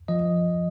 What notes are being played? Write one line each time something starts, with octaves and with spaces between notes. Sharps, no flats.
F3 D#5